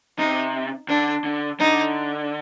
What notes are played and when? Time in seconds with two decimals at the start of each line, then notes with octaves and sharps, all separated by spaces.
0.18 C3 D#4
0.88 D3 D4
1.24 D3
1.60 D3 D#4